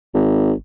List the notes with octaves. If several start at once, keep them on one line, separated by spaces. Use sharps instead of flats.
G#1